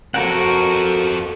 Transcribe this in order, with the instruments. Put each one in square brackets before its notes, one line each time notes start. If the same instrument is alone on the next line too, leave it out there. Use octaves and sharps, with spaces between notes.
[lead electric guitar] C4 A4 [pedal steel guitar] F#4 A#4 F#5